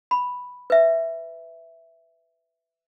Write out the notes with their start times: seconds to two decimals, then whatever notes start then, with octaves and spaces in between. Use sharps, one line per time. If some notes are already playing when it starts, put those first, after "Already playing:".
0.11 B5
0.70 B4 E5